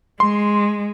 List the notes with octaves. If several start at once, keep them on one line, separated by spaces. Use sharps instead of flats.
G#3 C6